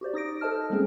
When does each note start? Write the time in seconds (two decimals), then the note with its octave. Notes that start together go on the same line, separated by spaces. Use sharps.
0.01 F#4 G4 C5 D5
0.14 D#4 D#6 A#6 D7
0.41 A4 C5 D#5 A5 F6
0.70 G3 G#3 A#3 C4 C#4 G#4